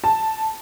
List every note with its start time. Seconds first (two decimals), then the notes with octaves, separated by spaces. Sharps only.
0.04 A5